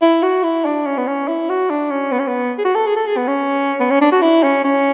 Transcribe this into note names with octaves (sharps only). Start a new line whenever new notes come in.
E4
F#4
E4
D4
C#4
B3
C#4
E4
F#4
D4
C#4
B3
C#4
B3
G#4
F#4
A4
G#4
A4
G#4
B3
C#4
B3
C#4
D4
F#4
E4
C#4
C#4